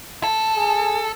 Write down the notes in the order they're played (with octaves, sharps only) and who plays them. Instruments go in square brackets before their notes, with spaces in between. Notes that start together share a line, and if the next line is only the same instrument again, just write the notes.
[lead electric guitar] A4
[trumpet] G#4